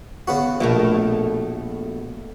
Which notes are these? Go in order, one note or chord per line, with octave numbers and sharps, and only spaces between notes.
C#3 B3 F#4
A#1 B2 A3 A#4